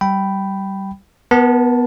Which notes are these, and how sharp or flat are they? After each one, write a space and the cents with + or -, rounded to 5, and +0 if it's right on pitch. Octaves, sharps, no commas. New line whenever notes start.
G3 -20 G5 -10 B5 +0
B3 +0 A#4 +40 A5 +0